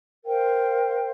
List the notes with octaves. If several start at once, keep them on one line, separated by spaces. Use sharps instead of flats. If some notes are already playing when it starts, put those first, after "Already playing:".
A#4 C5 F5 G5